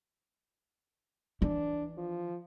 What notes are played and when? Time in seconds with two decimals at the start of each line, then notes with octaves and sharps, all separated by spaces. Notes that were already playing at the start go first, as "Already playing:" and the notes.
1.42 E3 D4
1.98 F3